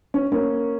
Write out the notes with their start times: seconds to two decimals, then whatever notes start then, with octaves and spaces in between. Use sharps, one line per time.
0.14 C#4
0.32 A#3 C#4